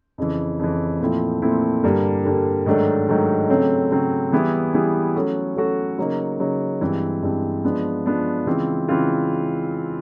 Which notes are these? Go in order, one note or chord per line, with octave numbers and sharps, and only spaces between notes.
F2 C#3 E3
F2 C#3 E3
A#2 F3 A3 C4 E4
A#2 F3 A3 C4 E4
G2 D3 G3 A#3
G2 D3 G3 A#3
G#2 D#3 F#3 A3 D4
G#2 D#3 F#3 A3 D4
C#3 F#3 A3 C4
C#3 F#3 A3 C4
E3 G3 B3 E4 G#4
E3 G3 B3 E4 G#4
F#3 A3 C#4 F#4 A4
F#3 A3 C#4 F#4 A4
C#3 F#3 A#3 D#4
C#3 F#3 A#3 D#4
G2 E3 G#3 C4
G2 E3 G#3 C4
F3 G#3 B3 D4
F3 G#3 B3 D4
C#3 E3 G#3 C4 F4
C#3 E3 G#3 C4 F4